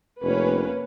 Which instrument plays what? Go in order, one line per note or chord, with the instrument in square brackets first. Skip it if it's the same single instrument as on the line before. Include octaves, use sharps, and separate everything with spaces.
[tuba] F1 [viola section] A#3 C#4 B4